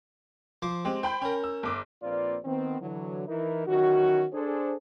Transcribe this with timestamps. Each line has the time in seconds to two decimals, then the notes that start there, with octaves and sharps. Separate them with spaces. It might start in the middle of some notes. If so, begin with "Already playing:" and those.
0.62 F3 C5 D6
0.85 G#3 C4 G4
1.03 C5 G5 B5 G6
1.22 C#4 A#4
1.44 E6
1.63 G1 D6
2.02 A#1 A#3 C4 F4 B4 D5
2.45 D#3 B3 C4
2.81 D3 E3 F#3
3.28 E3 D#4 E4 A#4
3.67 D#3 E3 F#3 C#4 F#4
4.33 D4 G#4 A4 C5